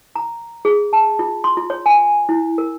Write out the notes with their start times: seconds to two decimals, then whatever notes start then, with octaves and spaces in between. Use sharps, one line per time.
0.16 A#5
0.65 G#4
0.93 A5
1.19 F4
1.44 C6
1.57 F4
1.70 C#5
1.86 G#5
2.29 E4
2.58 A#4